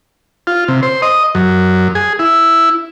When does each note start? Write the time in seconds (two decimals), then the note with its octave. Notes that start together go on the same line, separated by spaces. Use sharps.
0.47 F4
0.68 C3
0.83 C5
1.02 D#5
1.35 F#2
1.95 G#4
2.19 E4